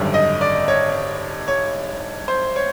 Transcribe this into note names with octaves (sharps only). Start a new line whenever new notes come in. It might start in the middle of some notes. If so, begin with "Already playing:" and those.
Already playing: G#1 F#2 D3 G3
D#5
D5
C#5
C#5
C5
C#5